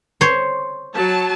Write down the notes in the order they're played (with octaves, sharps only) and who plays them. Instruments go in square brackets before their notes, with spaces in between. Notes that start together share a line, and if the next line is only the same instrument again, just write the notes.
[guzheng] C5 C#5
[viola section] F#3 A5